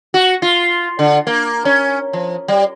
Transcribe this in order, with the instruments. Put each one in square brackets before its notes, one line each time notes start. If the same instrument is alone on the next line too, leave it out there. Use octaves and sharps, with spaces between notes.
[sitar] F#4
F4
D3
A#3
C#4
F3
G3